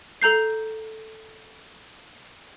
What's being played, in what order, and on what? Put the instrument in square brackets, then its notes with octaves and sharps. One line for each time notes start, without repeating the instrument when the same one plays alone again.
[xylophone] A4 A#5 G6 C7